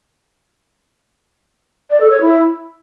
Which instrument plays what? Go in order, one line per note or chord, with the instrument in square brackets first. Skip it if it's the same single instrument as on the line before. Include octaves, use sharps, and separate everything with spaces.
[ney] D5
A4
C#5
E4